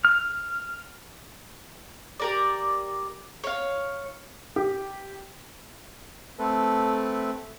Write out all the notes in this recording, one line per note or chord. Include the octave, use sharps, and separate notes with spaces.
F6
G4 A#4 D5
C#5 F5
G4
A3 C4 A4 B4